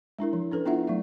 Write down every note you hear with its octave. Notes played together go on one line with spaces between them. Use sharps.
G#3 D4 E4 A#4
F3
C#4 D4 A4 B4
B3 D4 E4 F4 E5 F#5
F#3 A3 E5